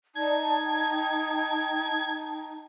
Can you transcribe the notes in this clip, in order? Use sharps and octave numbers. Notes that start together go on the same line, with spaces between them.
D#4 D5 A5 G#6
G5 A5